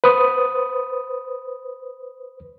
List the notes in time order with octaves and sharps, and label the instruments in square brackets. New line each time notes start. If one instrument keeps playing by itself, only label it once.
[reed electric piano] B4 C5 D#6